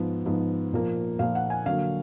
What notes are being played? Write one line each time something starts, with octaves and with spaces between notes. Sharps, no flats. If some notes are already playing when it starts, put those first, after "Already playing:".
Already playing: G#2 F3 B3
G#2 F3 B3
A#2 F3 A#3
A#2 F3 A#3 F5
F#5
G#5
D3 F#3 A#3 F5